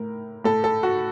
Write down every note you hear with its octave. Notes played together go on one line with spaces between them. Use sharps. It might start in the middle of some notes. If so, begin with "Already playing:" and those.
Already playing: A2 A#4
A2 A4
A4
F#4